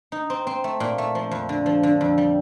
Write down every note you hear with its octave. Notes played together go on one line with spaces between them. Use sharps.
D#4
C4
C4
A3
A#2
A3
F3
F2
D3
F3
D3
F2
G3